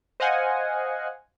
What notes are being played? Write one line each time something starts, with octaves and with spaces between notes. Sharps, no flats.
C5 D#5 F5 F#5 G#5